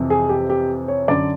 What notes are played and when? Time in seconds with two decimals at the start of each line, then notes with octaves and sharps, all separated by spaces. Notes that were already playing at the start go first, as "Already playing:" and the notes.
Already playing: F2 C3 E3
0.10 G#4
0.29 G4
0.50 G4
0.88 C#5
1.08 F#2 D3 D5